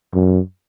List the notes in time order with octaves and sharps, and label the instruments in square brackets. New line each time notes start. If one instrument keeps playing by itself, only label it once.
[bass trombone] F#2